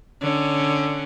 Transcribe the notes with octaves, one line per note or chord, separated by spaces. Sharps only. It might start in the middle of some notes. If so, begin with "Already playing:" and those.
D3 C#4